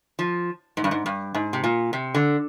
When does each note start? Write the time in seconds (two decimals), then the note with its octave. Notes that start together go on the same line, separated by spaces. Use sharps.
0.19 F3
0.77 G#2
0.84 G2
0.91 G#2
1.06 G2
1.35 G#2
1.53 C3
1.64 A#2
1.93 C3
2.15 D3